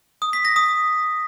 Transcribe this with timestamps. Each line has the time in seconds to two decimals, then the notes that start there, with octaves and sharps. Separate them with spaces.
0.22 D#6
0.33 B6
0.45 A#6
0.56 D#6